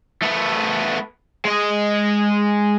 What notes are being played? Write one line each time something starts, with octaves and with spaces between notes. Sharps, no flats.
A3 B3
G#3 D#5